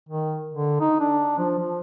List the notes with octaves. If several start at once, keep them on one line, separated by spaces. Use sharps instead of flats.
D#3
D3
D#4
D4
F3
F3